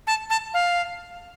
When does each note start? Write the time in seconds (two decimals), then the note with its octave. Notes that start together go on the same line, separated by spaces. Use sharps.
0.07 A5
0.30 A5
0.54 F5